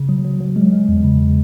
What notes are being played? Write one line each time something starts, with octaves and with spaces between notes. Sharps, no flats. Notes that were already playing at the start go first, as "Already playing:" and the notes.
Already playing: C#3
F#3
F#3
F#3
G#3
G#3
E2
C#3